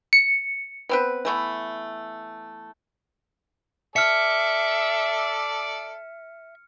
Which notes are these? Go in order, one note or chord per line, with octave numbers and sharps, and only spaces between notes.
C#7
B3 C4 B4
E3 A3 B3
A4 D5 E5 F6 C#7